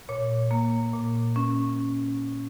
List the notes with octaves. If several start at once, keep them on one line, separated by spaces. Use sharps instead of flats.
A#2 C#5
A#3
A#2
C#4